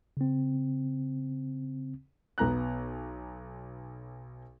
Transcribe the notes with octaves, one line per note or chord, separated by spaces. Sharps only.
C#3 C4
B1 B3 A#5 F#6